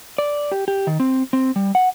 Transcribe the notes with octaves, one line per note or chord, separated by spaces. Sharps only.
D5
G4
G4
D#3
C4
C4
G3
F#5